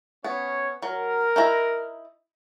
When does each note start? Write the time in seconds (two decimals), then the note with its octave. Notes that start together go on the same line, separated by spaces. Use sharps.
0.24 B3 C#4 C#5
0.82 F#3 A#4
1.36 D#4 E4 A#5